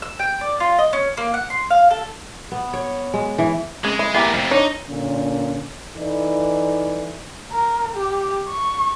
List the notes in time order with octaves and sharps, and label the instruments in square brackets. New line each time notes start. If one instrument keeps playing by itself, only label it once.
[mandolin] E6
G5
D5
F4
D#5
C#4
A#3
F#5
C6
F5
A4
[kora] B3
C#5
G#3
E3
[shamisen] C#3 [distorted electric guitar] G#3 G#4
[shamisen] E4
[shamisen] E3 E4 G4 [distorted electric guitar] B3 A#4
[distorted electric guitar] F2 C3
[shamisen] D4 C#5 [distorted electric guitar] D#4
[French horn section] A#2 D3 C#4
E3 D#4 A4 D5
[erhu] A#4
G4
C#6